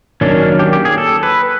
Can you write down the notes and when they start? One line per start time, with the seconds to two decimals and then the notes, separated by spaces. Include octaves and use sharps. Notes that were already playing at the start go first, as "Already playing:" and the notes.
0.21 D#3 F#3 A#3 C#4 D4
0.59 G4
0.73 G4
0.85 G#4
0.98 A4
1.23 B4